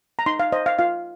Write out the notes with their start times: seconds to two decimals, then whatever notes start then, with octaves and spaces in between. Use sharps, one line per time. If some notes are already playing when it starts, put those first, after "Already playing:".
0.19 A#5
0.26 D#4 C6
0.40 F5
0.52 C5 D#5
0.66 F5
0.79 F4 F5